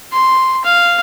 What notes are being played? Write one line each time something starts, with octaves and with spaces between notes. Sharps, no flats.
C6
F5